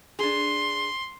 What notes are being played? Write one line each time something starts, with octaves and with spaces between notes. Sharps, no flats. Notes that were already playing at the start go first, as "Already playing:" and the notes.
D4 G#4 C6